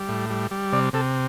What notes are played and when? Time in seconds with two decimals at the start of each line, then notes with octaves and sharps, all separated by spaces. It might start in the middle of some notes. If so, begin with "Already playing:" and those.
Already playing: G3
0.09 A2
0.30 G3
0.51 G3
0.72 C3 D5
0.93 C3 A4